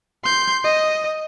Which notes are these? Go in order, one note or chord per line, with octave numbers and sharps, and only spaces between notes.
C6 G6
D#5